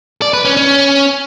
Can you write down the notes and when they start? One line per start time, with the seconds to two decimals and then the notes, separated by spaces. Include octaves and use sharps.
0.22 D5
0.33 B4
0.45 C#4
0.57 C#4